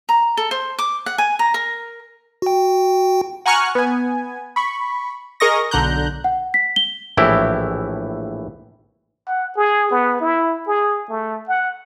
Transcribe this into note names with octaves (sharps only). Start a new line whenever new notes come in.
A#5
A4
C5
D6
F#5
G#5
A#5
A#4
F#4 G5
F#5 G#5 A#5 C#6 F6 F#6
B3 G#5
B5 C#6
G#4 A#4 D#5 C#6 D#6 A#6
B1 D3 A#5 F#6 G6
F#5
B6
G7
A#1 A2 E3 E4 G4
F#5
G#4
B3
E4
G#4
A3
F#5